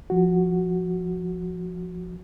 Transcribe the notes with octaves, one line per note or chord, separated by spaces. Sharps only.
F3 F#4